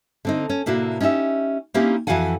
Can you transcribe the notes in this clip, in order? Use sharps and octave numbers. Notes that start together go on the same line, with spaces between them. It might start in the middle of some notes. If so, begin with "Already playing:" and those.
D3 C4 D#4
C#4
A2 C3 A#3 D4 E4 F#4
C#4 D#4 E4 G4 E5
A#3 C4 C#4 D#4 E4 G4
F2 E3 F#4 F5 F#5 G#5